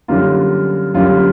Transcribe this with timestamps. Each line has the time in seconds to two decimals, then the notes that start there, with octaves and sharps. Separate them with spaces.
0.08 F#2 D3 G3 A#3 F4
0.94 F#2 D3 G3 A#3 F4